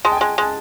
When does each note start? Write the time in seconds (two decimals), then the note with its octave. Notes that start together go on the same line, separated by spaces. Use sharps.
0.05 G#3 A5
0.12 G5
0.17 G#5
0.21 G#3
0.38 G#3 A5